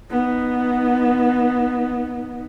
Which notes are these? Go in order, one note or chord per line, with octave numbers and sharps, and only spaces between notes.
B3 D#4